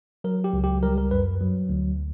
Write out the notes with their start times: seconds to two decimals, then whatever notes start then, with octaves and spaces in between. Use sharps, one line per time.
0.24 F#3 A#4
0.44 G4
0.53 C#2
0.64 G4
0.83 G3 A#4
0.98 A#4
1.11 F#2 B4
1.41 F#3
1.69 D2